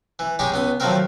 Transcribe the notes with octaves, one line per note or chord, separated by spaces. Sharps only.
E3
G#3 D#4 G4 C#5
C#2 B3 D#6
D#3 F3 F#3 A3 C4 A#4